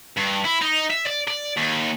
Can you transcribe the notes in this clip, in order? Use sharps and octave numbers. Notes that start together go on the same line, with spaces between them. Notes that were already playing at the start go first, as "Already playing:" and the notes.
G2
E4
D#4
E5
D5
D5
D#2